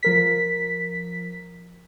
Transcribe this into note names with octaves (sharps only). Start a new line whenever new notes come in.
F3 A#4 B6